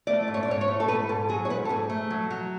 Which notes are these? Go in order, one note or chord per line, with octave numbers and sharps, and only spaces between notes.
A3 D5
G#2
C#5
D5
G#2 C#5
C#5
A3
A4
G#2 B4
G#2 A4
F#3 G#4
C#5
G#2 B4
A4
G#2 G#4
A3
F#3
F#3